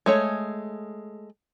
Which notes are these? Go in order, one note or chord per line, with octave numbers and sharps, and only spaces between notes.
G#3 A3 C#5